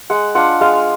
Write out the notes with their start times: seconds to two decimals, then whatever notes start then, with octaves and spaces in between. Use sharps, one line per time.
0.10 G#3 F#5
0.35 D4 F4 F#5
0.61 G#3 F5